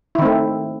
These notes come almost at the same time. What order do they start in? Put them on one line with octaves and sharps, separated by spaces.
E4 D#3 C4 A3